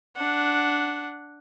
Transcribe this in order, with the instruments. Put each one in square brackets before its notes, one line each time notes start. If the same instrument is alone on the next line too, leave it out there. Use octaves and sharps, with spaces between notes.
[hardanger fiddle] D4 F#5